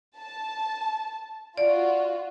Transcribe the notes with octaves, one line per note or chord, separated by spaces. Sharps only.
A5
F4 F#4 D5